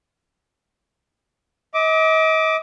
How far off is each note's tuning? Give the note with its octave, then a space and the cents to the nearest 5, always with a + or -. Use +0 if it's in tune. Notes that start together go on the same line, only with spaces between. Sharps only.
D#5 +40 D6 +0